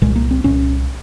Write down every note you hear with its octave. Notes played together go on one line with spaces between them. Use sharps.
C2 A#2 G#3
A#3
C4
C2 A#2 C#4